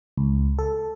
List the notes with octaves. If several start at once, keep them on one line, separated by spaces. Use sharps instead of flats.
C#2
A4